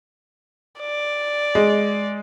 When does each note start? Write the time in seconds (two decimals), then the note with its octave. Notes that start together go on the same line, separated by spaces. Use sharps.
0.80 D5
1.55 G#3